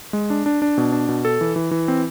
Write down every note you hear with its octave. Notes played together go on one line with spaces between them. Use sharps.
G#3
D4
D4
D4
B2
D4
B2
A4
E3
E3
E3
C4